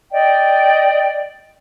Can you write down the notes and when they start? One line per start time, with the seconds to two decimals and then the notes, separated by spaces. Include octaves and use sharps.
0.12 D5 D#5 G5